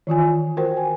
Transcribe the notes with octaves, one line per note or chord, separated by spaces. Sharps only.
D#3 E3 F4 G#5
F#4 A#4 C5 G5
G#5